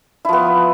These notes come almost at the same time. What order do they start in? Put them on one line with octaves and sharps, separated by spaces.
E4 F3 B3